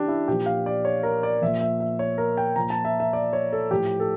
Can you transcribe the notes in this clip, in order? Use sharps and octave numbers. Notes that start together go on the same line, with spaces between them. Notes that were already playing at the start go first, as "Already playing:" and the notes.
Already playing: C#3 E3 D4 G4
E4
A#2 F3 G4
F5
D5
C#5
A#4
D5
A#2 F3 E5
E5
E5
C#5
A#4
G5
A#2 F3 A#5
A5
E5
E5
D5
C#5
A4
A2 F3 G4
A4